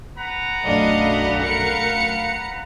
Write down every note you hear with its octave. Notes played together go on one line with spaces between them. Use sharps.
B4 F#5 A#5
B1 F#2 A3 D4 D#5 F5
A#4 F5 C#7